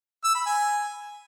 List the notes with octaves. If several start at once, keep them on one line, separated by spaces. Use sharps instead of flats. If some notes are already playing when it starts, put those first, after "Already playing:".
E6
B5
G#5